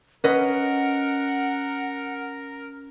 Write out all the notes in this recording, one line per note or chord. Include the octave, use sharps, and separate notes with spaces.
C#4 A#4 B4 D#5 F#5